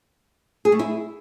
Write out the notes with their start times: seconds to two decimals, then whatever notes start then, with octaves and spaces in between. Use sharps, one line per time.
0.65 G#4
0.72 A3
0.79 E4